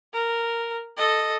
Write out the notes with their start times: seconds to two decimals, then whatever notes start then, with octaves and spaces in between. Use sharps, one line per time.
0.13 A#4
0.97 A4 D#5